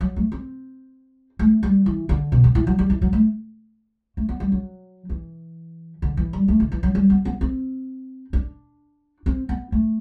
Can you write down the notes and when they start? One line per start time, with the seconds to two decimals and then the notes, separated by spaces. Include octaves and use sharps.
0.01 F#3
0.16 A3
0.32 C4
1.39 A3
1.63 G3
1.86 E3
2.09 D3
2.32 B2
2.44 D3
2.55 E3
2.67 F#3
2.79 G3
2.90 E3
3.02 F#3
3.13 A3
4.17 A3
4.29 B3
4.40 G3
4.52 F#3
5.09 E3
6.02 D3
6.17 E3
6.33 G3
6.48 A3
6.60 D3
6.72 E3
6.83 F#3
6.95 G3
7.10 B3
7.25 B3
7.41 C4
8.33 D4
9.26 C4
9.49 B3
9.72 A3